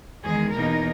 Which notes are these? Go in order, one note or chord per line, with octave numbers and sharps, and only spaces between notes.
E2 D#3 G#3 G#4
E2 B2 A#3 D#4 A#4